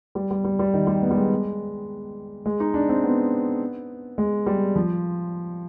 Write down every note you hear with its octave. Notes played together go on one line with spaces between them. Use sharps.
G3
G3
G3
G3
D#3
G3
B3
G3
G#3
G#3
D#4
D4
C4
B3
G#3
G3
F3